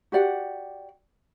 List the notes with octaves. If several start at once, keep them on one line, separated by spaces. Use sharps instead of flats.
F#4 G4 D5 F#5